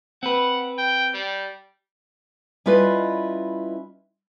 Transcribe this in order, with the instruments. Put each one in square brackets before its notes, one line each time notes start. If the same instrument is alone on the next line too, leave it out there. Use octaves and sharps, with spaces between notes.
[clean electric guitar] C4 B4 [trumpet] F#5
[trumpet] G5
G3
[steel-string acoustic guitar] G3 C#4 E4 F4 B4 D#5